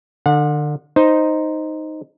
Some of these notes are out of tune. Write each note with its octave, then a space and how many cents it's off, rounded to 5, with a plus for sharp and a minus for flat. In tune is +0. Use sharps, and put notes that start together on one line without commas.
D3 +35 F#5 -35
D#4 +0 C5 +0